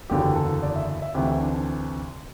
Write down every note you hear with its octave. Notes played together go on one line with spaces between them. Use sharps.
F#1 E2 D3 F#3 G4
A4
D5
E5
E5
D2 C3 E3 G4
E4
D4
D4